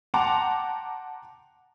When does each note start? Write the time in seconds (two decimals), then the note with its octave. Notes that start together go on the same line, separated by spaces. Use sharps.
0.14 F#5 G5 A5 A#5 C6 D6